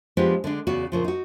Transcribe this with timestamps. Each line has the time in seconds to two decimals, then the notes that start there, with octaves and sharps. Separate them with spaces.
0.17 F3 G#3 B3 D4 F4 G4
0.44 D3 G#3 D4
0.67 E2 C#3 B3 F#4 D5
0.92 A#2 C#3 F3
1.04 D#4 F#4